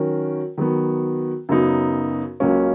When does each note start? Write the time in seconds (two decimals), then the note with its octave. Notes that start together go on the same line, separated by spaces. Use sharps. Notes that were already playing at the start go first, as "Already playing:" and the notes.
Already playing: D#3 F#3 C#4 F#4 A#4
0.58 D#3 F#3 B3
1.49 F#2 C#3 F#3 B3 D#4
2.40 C#2 C#3 F#3 A#3 C#4